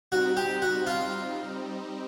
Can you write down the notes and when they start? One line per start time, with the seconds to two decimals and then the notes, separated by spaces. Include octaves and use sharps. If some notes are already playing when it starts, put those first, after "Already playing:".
0.12 G3 C4 D#4 F#4
0.37 G4
0.62 F#4
0.87 F4